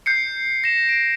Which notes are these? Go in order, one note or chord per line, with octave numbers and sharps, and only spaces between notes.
G6 C7 C#7
A#6 E7
D7